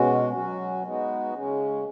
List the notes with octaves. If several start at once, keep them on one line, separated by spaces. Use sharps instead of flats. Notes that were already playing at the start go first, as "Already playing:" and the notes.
Already playing: B2 G#3 C#4 F#4
F#3 C#4 F#4
G#3 B3 D#4 F#4
C#3 G#3 C#4